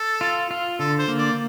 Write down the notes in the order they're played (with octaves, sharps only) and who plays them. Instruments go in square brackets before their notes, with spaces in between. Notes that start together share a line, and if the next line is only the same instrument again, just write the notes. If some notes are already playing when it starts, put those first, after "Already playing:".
Already playing: [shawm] A4
[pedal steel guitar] F4
F4
[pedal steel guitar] D3 [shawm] A4
[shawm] C5
[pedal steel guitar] A#3
[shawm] D5